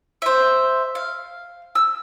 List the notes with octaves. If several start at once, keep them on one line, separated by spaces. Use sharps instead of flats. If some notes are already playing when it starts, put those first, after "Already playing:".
C5 E5
F5
E6